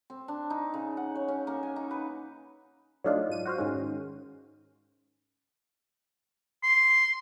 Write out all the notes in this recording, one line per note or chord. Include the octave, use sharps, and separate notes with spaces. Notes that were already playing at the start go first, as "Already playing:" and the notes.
C4
D4
D#4
C#3
F#5
C#5
C#4
A#3
G#5
D#4
B4
F#3 A3 D4 D#4 F4
G#2 D#7
F#4 C5 F5
G#2 D#3 G#3 C#4
C6